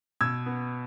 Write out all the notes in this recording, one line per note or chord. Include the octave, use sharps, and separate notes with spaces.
B2 E6 G#6
B3